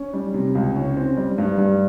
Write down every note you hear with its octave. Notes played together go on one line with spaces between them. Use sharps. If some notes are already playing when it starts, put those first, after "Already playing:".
Already playing: C#4
G3
C3
C#2
C#4
C4
G3
G2
G2